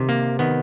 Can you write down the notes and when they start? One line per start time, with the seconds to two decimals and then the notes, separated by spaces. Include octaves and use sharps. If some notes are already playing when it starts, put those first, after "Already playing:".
Already playing: C3 D#3
0.09 A#3
0.39 D#3 B3